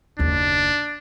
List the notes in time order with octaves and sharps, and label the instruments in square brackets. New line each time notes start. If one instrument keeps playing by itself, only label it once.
[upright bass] F#1 D#2 [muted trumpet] D4